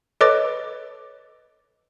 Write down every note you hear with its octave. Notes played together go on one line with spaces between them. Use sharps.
A4 B4 C#5 D#5 D6 A6